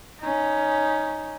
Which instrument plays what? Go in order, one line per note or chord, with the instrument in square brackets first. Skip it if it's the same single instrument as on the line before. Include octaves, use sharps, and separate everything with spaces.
[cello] C#4 D#4